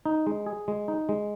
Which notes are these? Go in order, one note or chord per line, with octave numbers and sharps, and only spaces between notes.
D#4
G#3
G#4
G#3
D#4
G#3